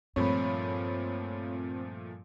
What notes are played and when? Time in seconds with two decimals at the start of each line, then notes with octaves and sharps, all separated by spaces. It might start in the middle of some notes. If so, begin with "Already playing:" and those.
0.16 G2 A#2 F3 A3 C4 C#5 B5